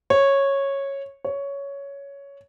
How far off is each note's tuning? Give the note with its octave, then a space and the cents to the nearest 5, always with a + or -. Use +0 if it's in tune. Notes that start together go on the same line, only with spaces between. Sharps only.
C#5 -10
C#5 +10